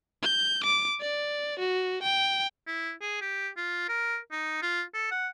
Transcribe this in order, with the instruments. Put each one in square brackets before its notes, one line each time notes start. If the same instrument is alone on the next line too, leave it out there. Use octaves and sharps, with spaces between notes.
[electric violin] G6
D6
D5
F#4
G5
[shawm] E4
G#4
G4
F4
A#4
D#4
F4
A4
F#5